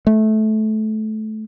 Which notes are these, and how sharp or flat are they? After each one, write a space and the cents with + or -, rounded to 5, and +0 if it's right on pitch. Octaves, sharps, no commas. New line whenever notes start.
A3 -20